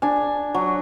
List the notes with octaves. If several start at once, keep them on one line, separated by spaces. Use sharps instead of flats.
D4 G#5
F#3